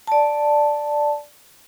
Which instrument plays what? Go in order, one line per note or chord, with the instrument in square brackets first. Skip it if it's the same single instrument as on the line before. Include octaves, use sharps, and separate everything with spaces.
[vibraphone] D5 A5